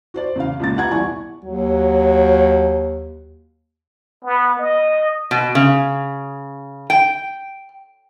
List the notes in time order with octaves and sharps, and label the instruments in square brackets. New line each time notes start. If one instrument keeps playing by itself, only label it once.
[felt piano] F#4 C5 D5
E2 C#3 F5
C#2 A#2 A6
B3 F4 G4 F#5 A#5 G#6
C2 E3 E4 D5 G#5 C#6
[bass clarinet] D#2 [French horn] F#3
[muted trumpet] B3
D#5
[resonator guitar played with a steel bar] B2
C#3
G5